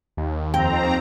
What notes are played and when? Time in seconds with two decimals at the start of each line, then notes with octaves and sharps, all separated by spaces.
0.17 D#2
0.54 F2 C4 G5 A#5